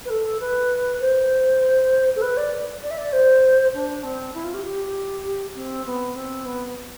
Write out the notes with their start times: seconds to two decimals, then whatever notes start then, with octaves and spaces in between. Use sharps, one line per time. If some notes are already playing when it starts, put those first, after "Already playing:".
0.05 B4
0.09 A4
0.40 B4
1.00 C5
2.15 A4
2.21 B4
2.37 D5
2.82 D5
2.90 E5
2.97 D5
3.12 C5
3.73 D4
4.03 C4
4.34 E4
4.44 F4
4.54 G4
4.64 G4
5.55 C4
5.85 B3
6.15 C4
6.45 B3